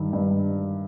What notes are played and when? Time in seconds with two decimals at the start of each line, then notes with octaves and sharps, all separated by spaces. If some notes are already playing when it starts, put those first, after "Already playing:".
Already playing: G2 D#3
0.13 G2